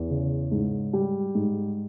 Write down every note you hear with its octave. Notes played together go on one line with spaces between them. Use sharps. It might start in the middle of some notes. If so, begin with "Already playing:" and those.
Already playing: E2
C#3
G#2
G3
G#2